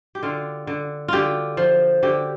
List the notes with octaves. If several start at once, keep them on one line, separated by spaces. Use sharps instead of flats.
G4
D3 F4
D3
D3 F4 G4
F3
D3 G4